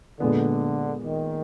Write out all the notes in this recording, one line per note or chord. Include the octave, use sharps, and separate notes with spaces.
A#2 D3 G#3 B3
D#3